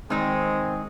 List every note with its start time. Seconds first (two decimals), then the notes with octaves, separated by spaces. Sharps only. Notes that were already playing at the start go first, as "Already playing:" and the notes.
0.10 D#3 G#3 C4 D#4 G#4